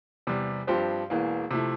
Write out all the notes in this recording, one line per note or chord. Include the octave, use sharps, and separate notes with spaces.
E2 C3 G3
G2 F3 C4 G4 C5
E1 E2 E3 A#3
C3 F3 A3 E4